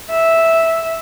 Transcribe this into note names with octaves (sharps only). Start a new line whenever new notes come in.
E5